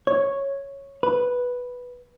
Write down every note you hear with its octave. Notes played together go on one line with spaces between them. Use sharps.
C#5
B4